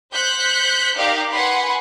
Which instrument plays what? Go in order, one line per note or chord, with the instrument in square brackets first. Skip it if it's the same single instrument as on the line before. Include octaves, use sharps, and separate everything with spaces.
[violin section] C5 F#6 G6 B6 C#7
D#4 G4 A#4 D5 F5
B4 F#5 G#5 B5 C6